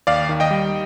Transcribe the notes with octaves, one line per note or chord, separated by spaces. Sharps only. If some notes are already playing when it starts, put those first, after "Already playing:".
D#2 D5 F5
D#3
D#5 G5
G3